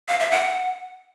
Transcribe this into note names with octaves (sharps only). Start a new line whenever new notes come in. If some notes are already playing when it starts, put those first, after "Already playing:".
F5
E5
F#5